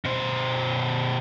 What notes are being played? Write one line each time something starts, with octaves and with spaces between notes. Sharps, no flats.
B2 C5